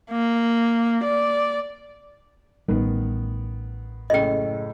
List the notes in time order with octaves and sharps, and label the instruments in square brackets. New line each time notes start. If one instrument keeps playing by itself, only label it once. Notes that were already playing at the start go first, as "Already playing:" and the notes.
[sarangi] A#3
D5
[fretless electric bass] A1 G3 [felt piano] D#3 B3
[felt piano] F#1 A2 G#4 [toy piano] D#5 G5